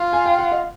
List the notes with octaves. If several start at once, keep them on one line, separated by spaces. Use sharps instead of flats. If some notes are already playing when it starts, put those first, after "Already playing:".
Already playing: F4
G#5
G5
F#5
D#5 F5